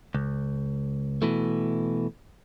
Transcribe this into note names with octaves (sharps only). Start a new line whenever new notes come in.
C#2
B2 E3 A3